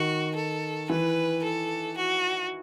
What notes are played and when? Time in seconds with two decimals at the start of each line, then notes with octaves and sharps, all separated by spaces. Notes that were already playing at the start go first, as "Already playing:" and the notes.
Already playing: D#3 F#4
0.36 A4
0.90 E3 B4
1.43 A4
1.97 F#4